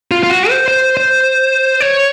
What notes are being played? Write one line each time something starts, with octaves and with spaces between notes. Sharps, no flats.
F4
F4
F#4
C5
C5
C5
C#5